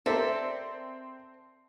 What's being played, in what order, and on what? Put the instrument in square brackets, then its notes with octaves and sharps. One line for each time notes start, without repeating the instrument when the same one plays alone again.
[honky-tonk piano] C4 [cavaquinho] A4 [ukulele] A#4 D5 E5